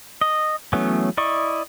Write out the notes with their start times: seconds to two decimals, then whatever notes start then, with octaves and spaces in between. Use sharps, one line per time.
0.21 D#5
0.73 E3 F#3 A3 B3 C#4
1.17 E4 D5 D#5 C#6